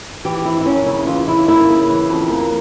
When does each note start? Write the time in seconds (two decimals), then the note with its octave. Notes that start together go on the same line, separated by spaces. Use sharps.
0.25 E3 G4
0.45 F2 E4
0.61 E4
0.66 A#3 C#4
0.86 C#3 E4
1.06 E3 F4
1.27 F2 E4
1.48 A#3 E4
1.68 C#3
1.89 E3
2.10 F2
2.30 A#3